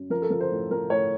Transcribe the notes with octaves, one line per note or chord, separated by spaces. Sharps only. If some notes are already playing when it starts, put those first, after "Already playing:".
Already playing: F#2
F3 A#4
A4
F3 A#4
C5
A2
F3 A#4
A2 C#5